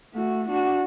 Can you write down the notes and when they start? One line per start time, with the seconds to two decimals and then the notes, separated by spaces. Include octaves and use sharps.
0.14 A3 F#4
0.49 D4 F#4